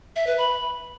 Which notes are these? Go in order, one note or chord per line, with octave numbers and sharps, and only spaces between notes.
E5
B4
B5